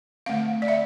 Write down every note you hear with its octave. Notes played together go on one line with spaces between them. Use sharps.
D3 A3 C4 F5
D5
E5